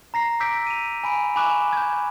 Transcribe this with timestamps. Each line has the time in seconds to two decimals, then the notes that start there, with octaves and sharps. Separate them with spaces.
0.14 A#5 A#6 C7
0.40 A#5 D6 E6 G6 B6 D7
0.67 D#7 F7
1.04 G#5 B5 D7
1.36 G#5 B5 C#6 D6 F#6 E7
1.73 G6 G#6